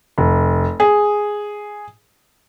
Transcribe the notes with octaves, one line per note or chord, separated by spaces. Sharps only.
F1
G#4